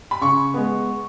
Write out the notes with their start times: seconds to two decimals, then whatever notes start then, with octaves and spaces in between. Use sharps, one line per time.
0.11 B5
0.21 C#3 C#6
0.54 G#3 B3